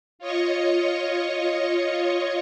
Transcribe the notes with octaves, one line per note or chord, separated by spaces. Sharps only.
F4 C#5 D#5 C#6